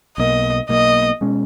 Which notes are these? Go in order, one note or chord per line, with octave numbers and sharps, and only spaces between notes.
B1 B2 A#3 D#5
B1 B2 A#3 D#5
B2 G#3 C#4